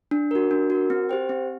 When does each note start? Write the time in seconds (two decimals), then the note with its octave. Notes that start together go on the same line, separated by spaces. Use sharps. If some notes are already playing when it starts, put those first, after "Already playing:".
0.11 D4
0.31 F#4 A#4
0.51 D4
0.70 F#4 A#4
0.90 C4
1.09 G4 C5 G5
1.29 C4